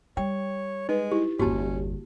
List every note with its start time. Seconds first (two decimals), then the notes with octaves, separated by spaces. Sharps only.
0.17 G3 C#5 G5
0.89 G#3 D#4 B4
1.12 E4 G4
1.39 G1 E2 A#3 C#4 F#4 G4 A5